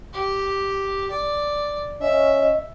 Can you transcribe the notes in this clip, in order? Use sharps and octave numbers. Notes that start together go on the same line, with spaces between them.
G4
D5
C#4 D#5 E5